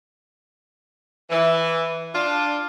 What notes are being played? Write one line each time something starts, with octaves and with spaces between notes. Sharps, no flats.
E3
D4 F4